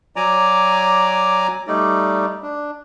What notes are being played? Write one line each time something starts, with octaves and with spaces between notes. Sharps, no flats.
F#3 D5 G#5 A#5 D6
G3 A3 D#4 D5
D4